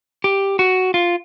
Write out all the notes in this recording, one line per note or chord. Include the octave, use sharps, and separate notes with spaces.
G4
F#4
F4